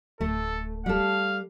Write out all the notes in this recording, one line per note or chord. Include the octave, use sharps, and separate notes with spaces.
D1 A3 A4
G3 A4 F5